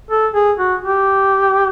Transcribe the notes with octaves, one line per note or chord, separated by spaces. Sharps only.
A4
G#4
F#4
G4